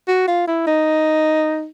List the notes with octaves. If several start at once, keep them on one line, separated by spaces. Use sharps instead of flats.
F#4
F4
E4
D#4